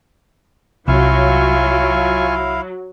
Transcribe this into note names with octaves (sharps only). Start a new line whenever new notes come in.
C2 F#3 E4 F4 F5 G#5 C#6